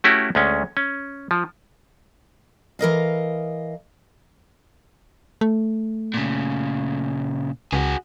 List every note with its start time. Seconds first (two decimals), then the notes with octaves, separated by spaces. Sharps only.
0.04 A3 C#4 E4 F#4 G4
0.35 D2 G#3 C#4
0.77 C#4
1.31 F3
2.79 E3 A#4 D#5 F5
5.41 A3
6.14 A#2 C#3
7.73 C#2 F#4 G#4